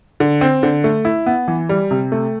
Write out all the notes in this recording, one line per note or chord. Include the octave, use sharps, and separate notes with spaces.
D3
C4
D3
A3
E4
B3
E3
G3
C3
A3